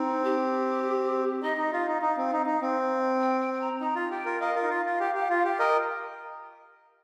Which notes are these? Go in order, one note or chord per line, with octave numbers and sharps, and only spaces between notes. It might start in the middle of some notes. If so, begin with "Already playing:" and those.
Already playing: C4 D#4
G4
D#4 D#5
D#4
F4 F5
D#4
D#4
C4
D#4
D#4
C4
G5
G5
G5
A#5
D#4 A#5
F4
G4 G5
F4 A#4
A#4 D#5 F5
F4 A#4
D#4
F4
F4
G4
G4
F4
G4
A#4 D#5 G5